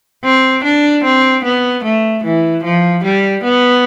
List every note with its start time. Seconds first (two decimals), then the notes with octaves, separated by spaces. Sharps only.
0.24 C4
0.64 D4
1.04 C4
1.44 B3
1.84 A3
2.24 E3
2.64 F3
3.04 G3
3.44 B3